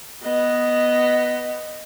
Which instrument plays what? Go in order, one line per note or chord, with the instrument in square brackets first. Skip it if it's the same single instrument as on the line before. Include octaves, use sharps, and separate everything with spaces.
[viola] B3 D#5